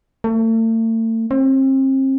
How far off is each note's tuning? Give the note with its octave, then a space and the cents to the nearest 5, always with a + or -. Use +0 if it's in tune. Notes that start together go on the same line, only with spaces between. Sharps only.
A3 +40
C4 +35